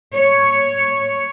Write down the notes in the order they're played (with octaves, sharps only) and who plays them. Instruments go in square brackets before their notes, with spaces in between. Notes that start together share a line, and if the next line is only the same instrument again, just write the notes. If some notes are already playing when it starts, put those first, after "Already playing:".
[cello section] C#5